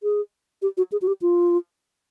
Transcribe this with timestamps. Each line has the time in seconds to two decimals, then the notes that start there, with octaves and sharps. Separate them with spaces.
0.03 G#4
0.62 G4
0.77 F#4
0.92 G#4
1.02 F#4
1.07 G4
1.22 F4